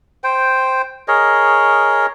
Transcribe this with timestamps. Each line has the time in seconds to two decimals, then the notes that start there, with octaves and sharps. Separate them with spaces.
0.24 C5 G5
1.08 G#4 A#4 C#5 D#5